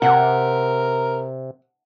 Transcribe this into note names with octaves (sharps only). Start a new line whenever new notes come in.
C3 A#4 F#5